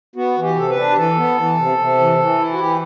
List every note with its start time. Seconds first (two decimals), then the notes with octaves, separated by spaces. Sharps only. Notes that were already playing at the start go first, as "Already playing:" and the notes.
0.16 B3 F#4
0.37 E3
0.42 G4
0.56 C3 A4
0.70 B4
0.76 D4
0.91 G4
0.97 E3 A4
1.17 B3
1.37 E3
1.58 C3
1.78 C3
1.99 E3
2.19 E3
2.39 E4
2.53 F#4
2.59 E3 G4